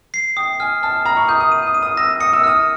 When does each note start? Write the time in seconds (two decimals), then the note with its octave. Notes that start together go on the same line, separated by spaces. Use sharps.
0.14 C7
0.36 G5 D#6
0.60 G#5 F6
0.83 A5 F6
1.05 A#5 B5
1.17 C#6
1.28 D#6 G6
1.41 D#6
1.52 D#7
1.67 D#6
1.74 D#7
1.82 D#6
1.97 E6 A#6
2.20 D#6 C#7
2.33 E6
2.44 D#6 F6